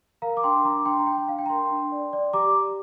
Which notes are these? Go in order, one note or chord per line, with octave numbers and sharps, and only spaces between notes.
A#4 F5 A#5
D6
D4 G5 C6
D4 A#5 D6
D4 G5 C6
A#5
D4 G5
G5
D4 F5
G5
A#5
A#4 G5 C6
D4
D5
D5
G4 A#5 D6